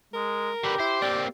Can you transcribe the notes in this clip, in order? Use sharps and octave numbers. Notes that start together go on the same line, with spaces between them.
G#3 A#4
D3 G4 B4
E4 C5
A#3 C4 D5